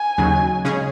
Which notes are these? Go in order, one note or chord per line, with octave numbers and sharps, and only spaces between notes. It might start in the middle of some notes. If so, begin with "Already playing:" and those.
Already playing: G#5
D#2 C#3 F#3 D#4
C#3 G#3 C#4 G#4